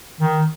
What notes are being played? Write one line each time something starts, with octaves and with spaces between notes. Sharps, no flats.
D#3